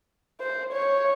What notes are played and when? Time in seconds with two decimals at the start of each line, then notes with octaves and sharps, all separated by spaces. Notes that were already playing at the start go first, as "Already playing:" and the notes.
0.41 C5
0.73 C#5